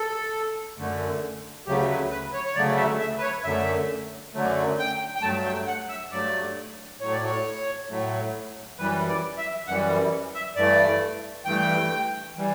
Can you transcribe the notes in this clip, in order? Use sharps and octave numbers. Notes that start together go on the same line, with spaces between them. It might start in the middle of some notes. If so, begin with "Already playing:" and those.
Already playing: A4
F#2 D3 A3
D2 C#3 F#3 A3 G4
B4
B4
C#5
C#5
D2 C#3 F#3 A3 D5
E5
E5
B4
C#5
F#2 D3 F#3 A3 E5
F#2 D3 F#3 A3
G5
G5
G2 F#3 A3 A5
G5
F#5
E5
G2 F#3 A3 D5
A2 F#3 A3 C#5
D5
C#5
A2 F#3 A3
F#2 E3 G3 B4
D5
E5
F#2 E3 G3 F#5
E5
G2 E3 A3 D5
G2 E3 A3 G5
E3 G3